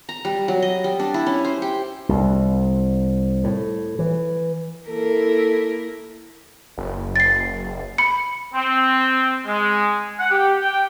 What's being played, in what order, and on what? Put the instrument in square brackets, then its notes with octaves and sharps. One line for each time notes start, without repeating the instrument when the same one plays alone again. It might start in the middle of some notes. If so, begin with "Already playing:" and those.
[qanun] A#5
G3
F#3
D#5
G3
D4
E4
C#4
C5
G4
[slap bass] C2
A2
E3
[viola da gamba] A#3 E4 A#4 [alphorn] A4
[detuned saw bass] F#1
[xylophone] A6 C7
B5 C#7
[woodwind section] C4
G#3
F#5
G4
G5